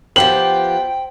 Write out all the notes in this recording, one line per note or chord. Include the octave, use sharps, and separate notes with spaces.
F3 B3 G4 C5 G5 F#7